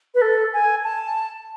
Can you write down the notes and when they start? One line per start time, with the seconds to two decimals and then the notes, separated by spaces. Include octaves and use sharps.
0.15 B4
0.22 A4
0.53 G#5
0.84 A5